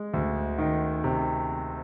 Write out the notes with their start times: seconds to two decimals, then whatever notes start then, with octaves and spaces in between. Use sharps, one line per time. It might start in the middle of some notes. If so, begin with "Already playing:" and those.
Already playing: G#3
0.14 D2
0.58 D#3
1.04 C3